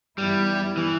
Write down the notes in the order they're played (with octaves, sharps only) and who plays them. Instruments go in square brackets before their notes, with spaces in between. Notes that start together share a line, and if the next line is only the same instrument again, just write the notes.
[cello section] G2 E3 B3 E4 [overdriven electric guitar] G3
[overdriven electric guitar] E3